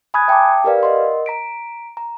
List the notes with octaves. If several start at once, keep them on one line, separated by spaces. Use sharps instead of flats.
G#5 B5 D#6 F#6 G#6
E5 G5 A5 A#5 D6
G4 A#4 B4 D5 F5
A#4 D#5 F#5 C6
A#5 B6 D7
A#5